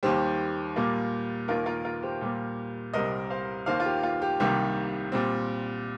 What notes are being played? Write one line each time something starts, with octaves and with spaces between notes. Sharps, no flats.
D#2 D#3 G3 G4 C5
A#2 G3 A#3
D#2 D#3 A#3 F4 A#4
F4 A#4
F4 A#4
G4 C5
A#2 G3 A#3
C2 C3 G3 C4 A#4 D#5
C5 F5
D#2 D#3 A#3 C5 F5
F4
G4
F4
G4
C2 C3 D#3 G3 A#3 G4
A#2 G3 C4